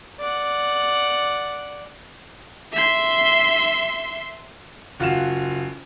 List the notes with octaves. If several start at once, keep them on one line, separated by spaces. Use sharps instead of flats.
D5 F#5
E5 C6
F#1 F4 F#4 F5 E7